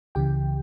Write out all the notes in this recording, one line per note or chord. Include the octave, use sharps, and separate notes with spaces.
C#2 C#3 E3 G4 G5